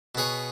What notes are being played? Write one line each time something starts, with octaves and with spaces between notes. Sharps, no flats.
B2 B3 G#4 C#5